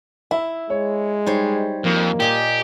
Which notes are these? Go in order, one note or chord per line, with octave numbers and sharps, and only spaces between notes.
E4 E5
G#3 C#5
G3 D#4 C5 C#5
F2 A#3
A#2 G4 D#5 G#5